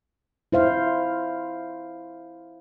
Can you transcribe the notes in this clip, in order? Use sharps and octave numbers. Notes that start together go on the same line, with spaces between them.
E4 C5 F5